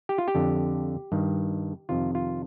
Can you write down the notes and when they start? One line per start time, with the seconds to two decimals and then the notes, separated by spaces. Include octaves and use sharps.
0.09 G4
0.18 F4
0.28 G4
0.35 F2 D3
1.12 G2 D#3
1.89 F2 C3 D#3 F4
2.15 F4